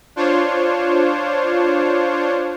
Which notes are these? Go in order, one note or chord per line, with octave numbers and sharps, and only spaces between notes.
D4 F4 C5 C#5